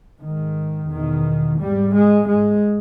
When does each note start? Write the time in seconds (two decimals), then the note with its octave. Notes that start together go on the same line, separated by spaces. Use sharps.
0.22 G#2 D#3
0.91 E2 B2 D#3
1.60 G#2 G3
1.94 G#3
2.28 G#2 G#3